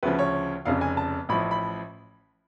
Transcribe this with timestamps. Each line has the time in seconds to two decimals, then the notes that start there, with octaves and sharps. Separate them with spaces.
0.03 D2 C#3 F3 B4
0.19 C#5
0.65 F1 F2 C#3 F5
0.81 G#5
0.97 A5
1.29 A1 A2 F3 B5
1.51 B5